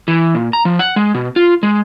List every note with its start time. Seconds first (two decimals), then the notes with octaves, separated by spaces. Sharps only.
0.08 E3
0.35 A#2
0.53 A#5
0.65 F3
0.79 F#5
0.96 G#3
1.14 B2
1.36 F4
1.63 G#3